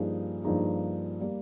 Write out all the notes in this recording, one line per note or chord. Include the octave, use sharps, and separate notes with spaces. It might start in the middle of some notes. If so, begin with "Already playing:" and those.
Already playing: G2 F3 A#3 D#4 G#4
G2 F3 A#3 D#4 G#4
G3 A#3